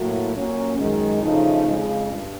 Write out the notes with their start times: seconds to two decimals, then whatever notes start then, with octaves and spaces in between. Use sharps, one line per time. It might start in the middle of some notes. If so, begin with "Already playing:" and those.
Already playing: A2 F#3 A#3 E4 F#4
0.36 A#2 F#3 A#3 C#4
0.79 F#2 D#3 G#3
1.22 E2 C#3 F3 A3 D#4
1.66 F2 C#3 F3 G#3
2.09 G2